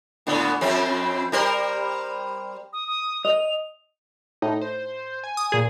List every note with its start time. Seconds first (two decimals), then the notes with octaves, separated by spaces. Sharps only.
0.27 A2 D3 B3
0.61 F2 C4
1.32 G3 A#4 C5
2.73 D#6
2.88 D#6
3.25 D#5 F7
4.42 A2 D#4
4.61 C5
5.24 G#5
5.37 D#6
5.52 A#2 G#4